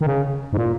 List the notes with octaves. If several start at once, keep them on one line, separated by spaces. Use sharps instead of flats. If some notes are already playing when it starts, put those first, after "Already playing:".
D#3
C#3
G#2
A#2